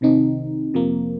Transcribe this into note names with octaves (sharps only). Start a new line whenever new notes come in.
C2 C3 D#3 C4 D#4
F2 C3 F3 A#3